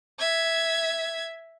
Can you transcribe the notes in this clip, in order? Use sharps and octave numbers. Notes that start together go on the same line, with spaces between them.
E5 G#6